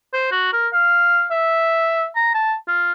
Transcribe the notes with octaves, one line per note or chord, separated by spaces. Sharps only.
C5
F#4
A#4
F5
E5
A#5
A5
F4